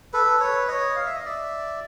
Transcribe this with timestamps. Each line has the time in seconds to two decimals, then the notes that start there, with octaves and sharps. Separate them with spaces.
0.13 A4 B4
0.40 B4 C#5
0.68 C#5 D#5
0.96 F5
1.06 E5
1.15 D#5
1.26 D5 E5